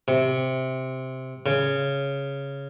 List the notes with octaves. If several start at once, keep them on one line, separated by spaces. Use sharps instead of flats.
C3
C#3